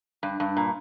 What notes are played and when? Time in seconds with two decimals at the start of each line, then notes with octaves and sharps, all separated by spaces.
0.23 G2
0.40 G2
0.57 A#2